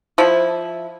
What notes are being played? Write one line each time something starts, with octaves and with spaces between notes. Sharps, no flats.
F3 E4